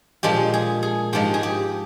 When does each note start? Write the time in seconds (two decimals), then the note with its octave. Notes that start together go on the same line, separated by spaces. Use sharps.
0.23 A#2 F3 G#3 G4
0.54 G#4
0.83 G#4
1.13 G#2 F3 G#3 G4
1.34 G#4
1.43 G4